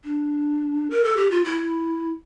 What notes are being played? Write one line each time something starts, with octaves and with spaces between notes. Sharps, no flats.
D4
A#4
A4
G4
F4
E4